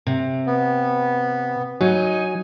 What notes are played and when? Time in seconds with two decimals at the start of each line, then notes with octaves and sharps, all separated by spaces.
0.07 C3
0.47 B3
1.81 F#3 D#4 G#5